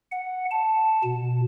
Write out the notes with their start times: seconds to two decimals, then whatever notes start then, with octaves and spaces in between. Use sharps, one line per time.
0.12 F#5
0.51 A5
1.04 B2